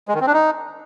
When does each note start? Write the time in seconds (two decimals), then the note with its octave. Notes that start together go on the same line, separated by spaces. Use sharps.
0.08 G#3
0.15 D#3
0.21 C4
0.27 D4
0.33 D#4